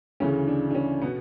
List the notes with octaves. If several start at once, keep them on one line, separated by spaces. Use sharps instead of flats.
D2 C#3 E3 C#4
D4
D4
C#4
B2 B3